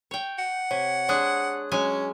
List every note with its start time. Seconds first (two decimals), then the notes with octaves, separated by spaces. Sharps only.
0.11 C#5 G5
0.38 F#5
0.71 C3 C#5
1.09 G#3 D4 C#5 D#6 F#6
1.72 F#3 G#3 C#4 G#5